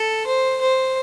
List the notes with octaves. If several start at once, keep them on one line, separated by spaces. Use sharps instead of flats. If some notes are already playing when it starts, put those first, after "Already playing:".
Already playing: A4
C5
C5